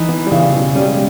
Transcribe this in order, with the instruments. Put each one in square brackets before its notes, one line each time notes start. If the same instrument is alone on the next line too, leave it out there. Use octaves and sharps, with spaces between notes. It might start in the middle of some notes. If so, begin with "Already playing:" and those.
Already playing: [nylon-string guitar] E3 [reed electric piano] D#4
[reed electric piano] B3
G3
[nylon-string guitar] C#3 [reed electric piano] E3
[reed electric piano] B2
[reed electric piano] G3 [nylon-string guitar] C#4
[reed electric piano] G#3